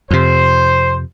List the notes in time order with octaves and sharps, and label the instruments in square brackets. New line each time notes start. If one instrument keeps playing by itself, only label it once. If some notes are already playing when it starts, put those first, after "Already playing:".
[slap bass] F2 C3 [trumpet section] C5